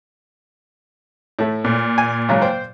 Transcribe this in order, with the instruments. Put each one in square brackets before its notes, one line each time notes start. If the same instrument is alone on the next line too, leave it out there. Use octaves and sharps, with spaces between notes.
[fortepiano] A2 A3
[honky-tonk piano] A#2
[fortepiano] G#5
G#2 C#3 F#3
C5 G5